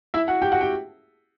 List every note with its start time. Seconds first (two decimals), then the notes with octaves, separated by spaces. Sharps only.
0.14 E4 E5
0.28 F#4 F#5
0.42 G4 G5
0.52 F#4 F#5
0.61 G4 G5